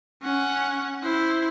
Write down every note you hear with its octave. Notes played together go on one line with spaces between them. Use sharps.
C#4 F#5
E4 C5